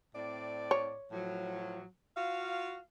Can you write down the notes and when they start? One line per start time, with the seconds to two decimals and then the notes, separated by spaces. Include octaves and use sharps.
0.15 A2 C4 D5
0.71 C#5
1.12 A2 F3 F#3
2.17 F4 F#4 F5